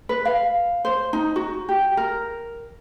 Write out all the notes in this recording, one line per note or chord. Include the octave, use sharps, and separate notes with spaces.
B4
F5
C5
D#4
F#4
G4
A#4